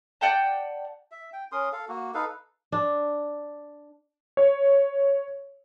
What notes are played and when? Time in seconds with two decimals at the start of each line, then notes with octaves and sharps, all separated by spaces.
0.21 D5 F#5 G5 A5
1.11 E5
1.33 G5
1.52 C#4 A#4 C6 D#6
1.73 A4 F5
1.89 A#3 F#4
2.14 D#4 A4 B4 F5
2.72 D4
4.37 C#5